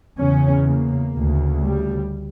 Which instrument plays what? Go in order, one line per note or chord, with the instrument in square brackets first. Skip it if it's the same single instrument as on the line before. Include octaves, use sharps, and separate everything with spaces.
[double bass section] E2 C#3 C#4
A#3
D2 C#3
G3